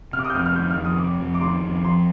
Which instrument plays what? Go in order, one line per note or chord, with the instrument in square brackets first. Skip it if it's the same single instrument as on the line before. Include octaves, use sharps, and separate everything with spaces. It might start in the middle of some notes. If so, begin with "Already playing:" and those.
[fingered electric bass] C3 [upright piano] F6
[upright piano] D6
D#6
G6
[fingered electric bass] F2 [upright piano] F6
[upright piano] F6
[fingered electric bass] D#3 [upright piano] G6
[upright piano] F6
[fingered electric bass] F2
[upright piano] D#6
[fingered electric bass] C3 [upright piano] D6
[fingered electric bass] F2
[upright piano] D6
[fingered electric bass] D#3 [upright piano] C6
[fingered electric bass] F2
[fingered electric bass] F3 [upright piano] C6